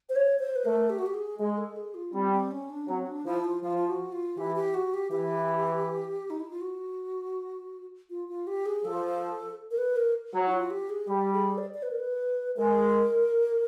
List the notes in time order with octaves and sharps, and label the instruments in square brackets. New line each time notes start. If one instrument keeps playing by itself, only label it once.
[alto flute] C5
C#5
C5
B4
[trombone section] A3 [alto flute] A#4
[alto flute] G4
F#4
G4
G#4
[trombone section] G#3 [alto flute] G#4
[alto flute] A4
G#4
F4
[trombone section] G3 [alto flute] C4
[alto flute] C4
C#4
D4
[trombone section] F#3 [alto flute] C4
[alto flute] D4
[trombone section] F3 [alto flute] E4
[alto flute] F4
[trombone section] F3 [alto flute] F4
[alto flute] F4
F#4
F4
[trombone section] E3 [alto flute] G4
[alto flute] G4
F#4
G4
[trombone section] E3 [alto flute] G4
[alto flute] D#4
E4
F4
F#4
F4
F4
G4
G#4
[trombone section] F3 [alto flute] A4
[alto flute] A#4
B4
A#4
[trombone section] F#3
[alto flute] E4
F4
G4
G#4
[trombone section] G3 [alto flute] G4
[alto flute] G#4
D5
D5
B4
A#4
B4
[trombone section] G#3 [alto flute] A#4